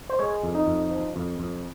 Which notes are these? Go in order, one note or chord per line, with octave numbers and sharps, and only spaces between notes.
C5
G#3 C#5
F2
D#4
F2
F3
F2
F2